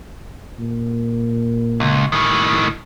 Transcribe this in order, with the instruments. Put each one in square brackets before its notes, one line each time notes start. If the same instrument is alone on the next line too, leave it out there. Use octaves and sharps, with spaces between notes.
[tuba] A#2
[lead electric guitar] C#2
A2 D#3